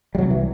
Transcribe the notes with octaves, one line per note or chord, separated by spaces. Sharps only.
G3
C2 C3 F#3
E3